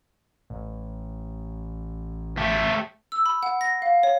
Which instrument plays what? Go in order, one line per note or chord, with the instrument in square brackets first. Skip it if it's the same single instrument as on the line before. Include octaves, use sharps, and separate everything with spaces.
[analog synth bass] A1
[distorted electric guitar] A3 G4
[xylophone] E6
B5
F#5
A#6
F5
C#5